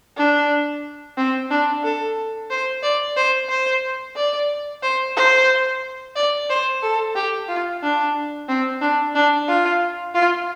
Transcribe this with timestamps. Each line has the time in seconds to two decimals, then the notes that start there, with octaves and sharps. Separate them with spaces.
0.17 D4
1.17 C4
1.51 D4
1.84 A4
2.50 C5
2.83 D5
3.16 C5
3.49 C5
4.16 D5
4.83 C5
5.16 C5
6.15 D5
6.50 C5
6.82 A4
7.15 G4
7.48 F4
7.83 D4
8.48 C4
8.81 D4
9.15 D4
9.48 F4
10.14 F4